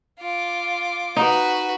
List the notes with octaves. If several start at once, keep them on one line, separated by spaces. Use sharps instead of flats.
F4 D6
D#4 F#4 B4